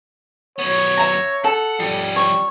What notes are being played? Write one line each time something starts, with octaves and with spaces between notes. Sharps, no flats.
F#2 B3 C#5
E5 A#5
A4 F#5
F3 G3 C#4
C#5